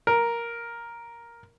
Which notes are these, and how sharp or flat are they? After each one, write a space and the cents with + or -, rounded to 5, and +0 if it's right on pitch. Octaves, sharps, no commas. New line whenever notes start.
A#4 +5